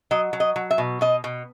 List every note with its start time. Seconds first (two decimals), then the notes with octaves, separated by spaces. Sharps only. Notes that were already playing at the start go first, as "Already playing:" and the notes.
0.11 F#3 D#5
0.33 F#3
0.40 D#5
0.56 F#3
0.71 E5
0.78 B2
1.01 B2 D#5
1.24 B2